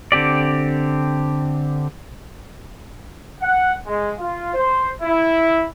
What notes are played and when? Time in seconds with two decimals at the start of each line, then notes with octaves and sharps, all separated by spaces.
0.12 D3 C4 G4 D5
3.40 F#5
3.87 G#3
4.19 F4
4.54 C5
5.02 E4